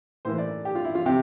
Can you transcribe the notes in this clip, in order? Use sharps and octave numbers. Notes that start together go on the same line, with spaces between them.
A2 E3 A#3 C5
D5
G4
F4
E4
F4
C3 G4